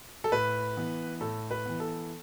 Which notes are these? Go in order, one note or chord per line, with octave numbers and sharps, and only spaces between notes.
A4
A2 B4
E3 B3
A2 A4
B4
E3 B3
A4